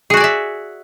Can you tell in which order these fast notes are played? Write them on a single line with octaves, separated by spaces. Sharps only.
G#4 F#4 G#5 D5 E5